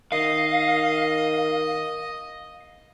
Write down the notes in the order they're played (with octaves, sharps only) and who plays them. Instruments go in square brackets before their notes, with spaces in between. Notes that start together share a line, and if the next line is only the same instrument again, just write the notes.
[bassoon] D#3 [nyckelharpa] D#5 [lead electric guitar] F5